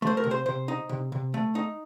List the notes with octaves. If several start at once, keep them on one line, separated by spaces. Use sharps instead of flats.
A3 C5
A#4
C3
C5
C3 C5
D#4
C3
C3
A3
D#4